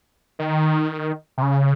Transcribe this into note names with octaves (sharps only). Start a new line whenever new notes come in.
D#3
C3
C#3